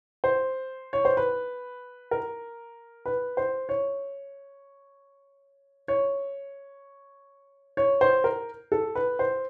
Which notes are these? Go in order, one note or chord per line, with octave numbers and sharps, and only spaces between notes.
C5
C#5
C5
B4
A#4
B4
C5
C#5
C#5
C#5
C5
A#4
A4
B4
C5